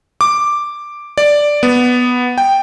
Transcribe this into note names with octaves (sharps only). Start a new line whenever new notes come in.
D6
D5
B3
G5